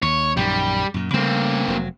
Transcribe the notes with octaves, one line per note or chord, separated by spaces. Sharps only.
D#2 C#5
A#1 F#2 D#3 G3
F#2 A#2
C#3 G3 A3 A#3 C4
F1 F#3